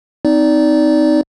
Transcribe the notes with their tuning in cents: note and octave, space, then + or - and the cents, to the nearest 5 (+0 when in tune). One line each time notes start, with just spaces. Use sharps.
C4 -25 D#4 +0 D5 -15